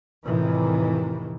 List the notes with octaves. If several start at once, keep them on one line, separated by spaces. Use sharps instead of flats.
F2 A2 C3 D#3 E3